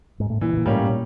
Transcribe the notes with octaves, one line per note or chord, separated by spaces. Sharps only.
G#2
A2
A#2 E3
B2
A#2
G#2 G3 A#3 C#4
A2
A#2